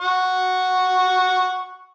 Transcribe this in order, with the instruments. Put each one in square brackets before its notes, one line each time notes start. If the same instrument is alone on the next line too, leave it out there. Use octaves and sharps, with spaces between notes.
[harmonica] F#5 C#6